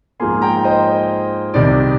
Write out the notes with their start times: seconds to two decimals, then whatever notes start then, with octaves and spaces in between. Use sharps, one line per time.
0.20 G#2 F3 A#3 G#5 C6
0.42 G5 A#5
0.64 C5 D#5
0.87 C5
1.54 C2 C3 D#3 D5